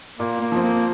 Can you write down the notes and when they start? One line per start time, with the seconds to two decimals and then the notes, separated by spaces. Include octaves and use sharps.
0.19 A#2 A#3
0.41 A#3
0.52 F3 C4
0.63 A#3